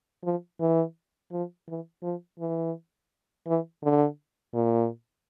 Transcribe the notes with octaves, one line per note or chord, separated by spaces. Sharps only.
F3
E3
F3
E3
F3
E3
E3
D3
A#2